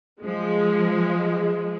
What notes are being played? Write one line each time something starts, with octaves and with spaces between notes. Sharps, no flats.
F3 G#3